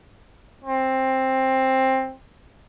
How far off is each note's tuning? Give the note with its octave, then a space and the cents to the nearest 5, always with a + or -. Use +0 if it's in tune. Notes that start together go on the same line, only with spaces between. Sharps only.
C4 +10